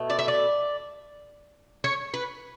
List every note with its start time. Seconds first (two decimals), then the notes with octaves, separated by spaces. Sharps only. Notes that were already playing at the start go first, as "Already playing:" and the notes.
Already playing: B2 A3 E4
0.10 D5
0.19 E5
0.28 D5
1.84 C#5
2.14 B4